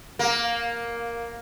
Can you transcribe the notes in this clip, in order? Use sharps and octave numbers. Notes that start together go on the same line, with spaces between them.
A#3